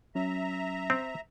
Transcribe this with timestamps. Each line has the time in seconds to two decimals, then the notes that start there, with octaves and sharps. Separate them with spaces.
0.15 F#3 C#4 E5 A#5
0.90 C4